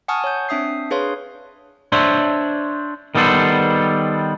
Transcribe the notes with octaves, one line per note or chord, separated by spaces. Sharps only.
F#5 G#5 A5 C#6 D#6 F6
C#5 G6
C4 D4 E5 D#6 C7
D4 G#4 B4 C#5 F5 C6
D4 C5 C#5 E5
D#3 G3 B3 A4 C5